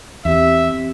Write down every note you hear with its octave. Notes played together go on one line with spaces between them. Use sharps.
E2 C4 G4 E5